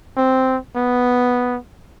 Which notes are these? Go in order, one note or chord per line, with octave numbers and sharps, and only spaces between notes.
C4
B3